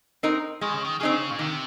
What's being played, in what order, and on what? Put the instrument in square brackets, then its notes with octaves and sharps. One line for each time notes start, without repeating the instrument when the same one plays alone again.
[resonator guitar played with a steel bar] C4 D#4 A#4
[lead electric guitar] D#3 [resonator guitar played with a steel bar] G#3
[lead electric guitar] C#3
D#3
[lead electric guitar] C#3 [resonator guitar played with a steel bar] C4 D#4 G#4
[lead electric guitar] A#2
[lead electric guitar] C3 [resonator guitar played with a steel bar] D#3